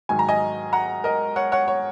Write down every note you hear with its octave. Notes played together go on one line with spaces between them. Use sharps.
G#2 D#3 F#3 G#5
A#5
D#5 G#5
F#5 A#5
A#4 D#5
C#5 F#5
C#5 F#5
C#5